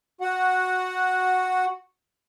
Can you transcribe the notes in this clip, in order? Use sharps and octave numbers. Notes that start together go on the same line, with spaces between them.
F#4 F#5